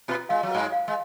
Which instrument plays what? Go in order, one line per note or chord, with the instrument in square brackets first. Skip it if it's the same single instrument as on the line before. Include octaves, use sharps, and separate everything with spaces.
[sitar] B2 B3 [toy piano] F4
[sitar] G#3 [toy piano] F5
[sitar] F#3
[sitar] G#2 G#3 [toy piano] B4
[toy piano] F5
[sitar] G#3